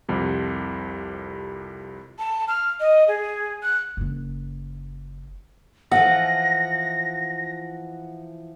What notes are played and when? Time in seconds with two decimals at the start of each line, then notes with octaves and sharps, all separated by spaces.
0.09 C2 F2 C3
2.19 A5
2.48 F6
2.80 D#5
3.08 G#4
3.63 F#6
3.97 F#1 C#4
5.91 E3 F3 A4 F#5 A#6